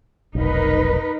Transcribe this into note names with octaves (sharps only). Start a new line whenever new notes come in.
F1 B1 D#4 A#4 B4